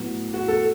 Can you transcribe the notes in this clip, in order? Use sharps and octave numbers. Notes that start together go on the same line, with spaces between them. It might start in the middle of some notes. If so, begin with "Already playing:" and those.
Already playing: A2 F#3 B3
F#4
A4